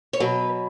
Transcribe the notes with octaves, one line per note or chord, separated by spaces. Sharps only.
C#5
B2 F#3 B4